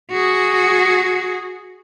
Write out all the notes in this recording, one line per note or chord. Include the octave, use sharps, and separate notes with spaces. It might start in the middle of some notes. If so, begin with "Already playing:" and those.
F#4 G#4